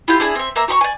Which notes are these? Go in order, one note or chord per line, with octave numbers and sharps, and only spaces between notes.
E4 F4 G4
D4 E4 G#4
C4 E5
A#3 E5 A#5
F#4 A#5 B5 C#6
D5 G#5